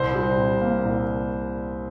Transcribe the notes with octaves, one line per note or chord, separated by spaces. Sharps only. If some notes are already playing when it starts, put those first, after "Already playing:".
Already playing: C2 C5
G3
C3
A#3
C2